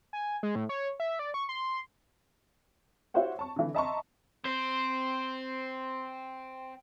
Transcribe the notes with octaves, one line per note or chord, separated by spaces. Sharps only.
G#5
G#3
A2
C#5
E5
D5
C#6
C6
E4 F#4 G4 C5 C#5 F#5
A5 C#6
D3 E3
D#5 E5 A5 A#5 C6 C#6
C4 C5